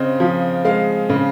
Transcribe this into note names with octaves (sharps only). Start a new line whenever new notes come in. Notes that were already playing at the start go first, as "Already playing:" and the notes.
Already playing: C#3 C4 D#5
F3
G#3 F5
C#3